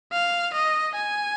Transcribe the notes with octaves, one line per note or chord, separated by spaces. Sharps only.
F5
D#5
G#5